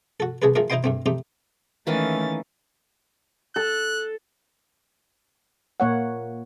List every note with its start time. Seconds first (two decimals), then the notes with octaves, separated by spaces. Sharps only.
0.20 F#4 A4
0.42 C2 G#3 G#4 A4 B4
0.55 D#3 F3 G#3 A3 A#4
0.70 D#4 E4 C5 D#5 G5 C6
0.84 G2 A3 C4
1.06 A3 C4 D#4 G4
1.87 D#3 E3 A3 A#3 C#4 A6
3.56 A4 F#6
5.80 A#2 A#3 C#5 F#5